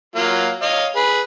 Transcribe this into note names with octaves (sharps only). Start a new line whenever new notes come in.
F#3 A#3 F4
C#5 D#5 F5
G#4 B4